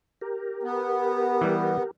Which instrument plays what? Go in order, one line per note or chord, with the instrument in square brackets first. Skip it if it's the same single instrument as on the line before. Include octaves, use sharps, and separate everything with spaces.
[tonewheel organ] G4 A#4
[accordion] B3
[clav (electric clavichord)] E3 G3